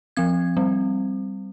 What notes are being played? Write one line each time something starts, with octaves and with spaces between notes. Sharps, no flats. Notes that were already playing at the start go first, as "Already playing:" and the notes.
F3 C4 G#6
G3 C4